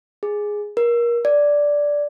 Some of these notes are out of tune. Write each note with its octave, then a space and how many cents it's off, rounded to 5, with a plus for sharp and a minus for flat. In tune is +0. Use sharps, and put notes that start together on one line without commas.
G#4 +0
A#4 +25
D5 -5